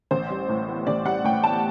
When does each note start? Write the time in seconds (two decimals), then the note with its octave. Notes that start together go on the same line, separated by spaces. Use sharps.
0.11 A1 C5
0.30 G3
0.49 A2
0.67 B3
0.87 A1 D5
1.05 G3 F#5
1.24 A2 G5
1.44 B3 A5